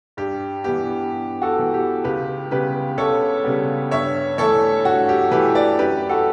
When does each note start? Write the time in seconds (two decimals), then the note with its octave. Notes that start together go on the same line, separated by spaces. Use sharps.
0.17 G2 G4
0.64 E3 B3 G4
1.11 G2
1.42 F#4 A4
1.57 E3 B3
1.74 G4
2.04 C#2 G4 B4
2.51 C#3 G3 B3 G4 B4
2.98 C#2 A4 C#5
3.44 C#3 G3 B3
3.91 G2 C#5 E5
4.38 E3 A3 E4 A4 C#5
4.85 G2 F#4
5.09 G4
5.31 E3 A3 E4 G4 B4
5.55 B4 D5
5.78 F#2 G4 B4
6.09 F#4 A4